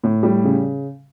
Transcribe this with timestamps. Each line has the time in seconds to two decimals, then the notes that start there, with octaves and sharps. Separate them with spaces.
0.04 A2
0.23 G3
0.44 C#3